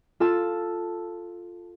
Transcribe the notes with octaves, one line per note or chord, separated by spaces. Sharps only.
F4 A4 A5 E6